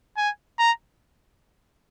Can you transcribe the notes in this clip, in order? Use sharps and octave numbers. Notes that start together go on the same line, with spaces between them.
G#5
A#5